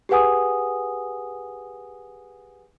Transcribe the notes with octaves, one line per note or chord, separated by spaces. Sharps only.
G4 G#4 B4 F#5 G#5 D#6